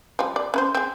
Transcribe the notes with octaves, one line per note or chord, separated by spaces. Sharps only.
F3 G3
D5
C#4 B4 C5
C4 G#4